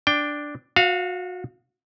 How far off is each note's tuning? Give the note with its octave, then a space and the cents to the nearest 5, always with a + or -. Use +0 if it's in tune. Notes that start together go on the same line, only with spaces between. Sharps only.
D4 +0 G5 +10
F#4 -30 F5 +0